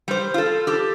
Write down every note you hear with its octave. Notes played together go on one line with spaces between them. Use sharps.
G3 C5
F4 A4
G4 A4